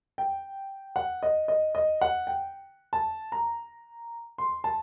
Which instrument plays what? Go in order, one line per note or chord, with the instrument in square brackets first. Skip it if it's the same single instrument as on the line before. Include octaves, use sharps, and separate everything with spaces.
[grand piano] G5
F#5
D#5
D#5
D#5
F#5
G5
A5
A#5
C6
A5